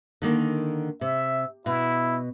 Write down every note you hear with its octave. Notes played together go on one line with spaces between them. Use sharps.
D3 D#3 A#3
C3 E5
B2 E4